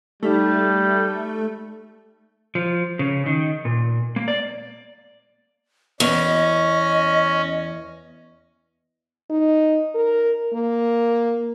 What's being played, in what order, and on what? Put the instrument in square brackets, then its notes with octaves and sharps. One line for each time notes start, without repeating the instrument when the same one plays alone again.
[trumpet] G3 [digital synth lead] A3 [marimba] D#4 G4 A4
[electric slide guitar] F3
C#3
D#3
A#2
A#3
D5
[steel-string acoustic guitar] E2 [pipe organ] C#4 [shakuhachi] D#5
[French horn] D#4
A#4
A#3